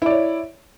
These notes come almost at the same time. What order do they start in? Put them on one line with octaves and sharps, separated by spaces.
E4 D5 C#5